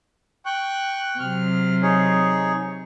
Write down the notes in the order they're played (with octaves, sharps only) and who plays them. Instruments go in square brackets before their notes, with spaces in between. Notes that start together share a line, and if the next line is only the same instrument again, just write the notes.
[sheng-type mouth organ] G5 C#6 F#6
[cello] C3 F#3 [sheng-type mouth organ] F6
[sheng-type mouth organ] D#4 G#4 C#5